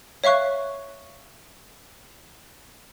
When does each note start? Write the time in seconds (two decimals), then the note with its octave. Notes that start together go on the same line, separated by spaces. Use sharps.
0.24 C#5 E5 F5 C#6 F#6